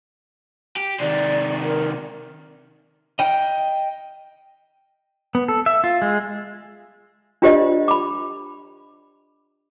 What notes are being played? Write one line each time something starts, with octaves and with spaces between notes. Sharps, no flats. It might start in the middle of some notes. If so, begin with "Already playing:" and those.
G4
C3 D#3 D5
A#4
D#5 G5
B3
A4
E5
F4
G#3
D4 F4 G4 C5 D5 D#5
B5 D6